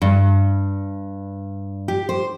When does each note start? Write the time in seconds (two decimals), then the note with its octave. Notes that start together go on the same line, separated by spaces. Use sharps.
0.02 G2
1.88 G4
2.09 C5